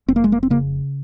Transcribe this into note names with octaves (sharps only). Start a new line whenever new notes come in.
F1 C4
A#3
G#3
A#3
C4
C#3 A#3